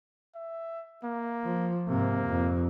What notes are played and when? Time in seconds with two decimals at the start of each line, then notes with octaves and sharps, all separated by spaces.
0.35 E5
1.03 A#3
1.45 F3
1.88 G#2 C3 A#3
2.26 F2